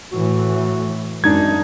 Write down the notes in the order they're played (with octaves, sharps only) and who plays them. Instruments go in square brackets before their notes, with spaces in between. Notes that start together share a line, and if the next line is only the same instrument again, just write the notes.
[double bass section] A2 E3 [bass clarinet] F#4
[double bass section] G#1 F#2 [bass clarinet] G#3 [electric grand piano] D4 D#4 G#6